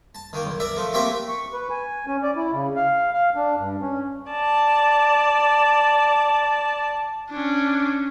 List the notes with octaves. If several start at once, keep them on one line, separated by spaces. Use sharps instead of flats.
A5
D#3 A#3
B1
A#4 D5 E5
F3 A3
A3 A#3 C4 G4 E5 A#5
C#6
B4
G#5
C#4
D5
E4
C#3
F5
F5
D4
G2
C#4
D5 A5
C#4 D4